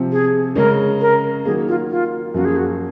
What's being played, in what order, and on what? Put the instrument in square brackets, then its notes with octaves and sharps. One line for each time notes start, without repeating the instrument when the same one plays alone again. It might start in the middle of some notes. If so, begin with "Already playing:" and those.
Already playing: [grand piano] C3 F3 C4
[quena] G#4
[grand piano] C#3 G#3 C#4 [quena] A#4
[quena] A#4
[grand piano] D#3 F#3 A#3 [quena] G#4
[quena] F4
F4
[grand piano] F#2 F3 A#3 F4 [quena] F#4
[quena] G#4
F#4